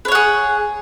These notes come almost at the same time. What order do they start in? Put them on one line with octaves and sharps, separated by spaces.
B4 C#5 F#5 G#4